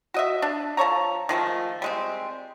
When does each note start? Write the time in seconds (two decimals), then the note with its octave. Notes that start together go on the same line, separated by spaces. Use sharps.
0.14 F#4 D#5 E5
0.42 D4
0.77 F3 A4 C#5 A#5
1.29 D#3 F3 G#3 A3
1.82 G3 G#3 C4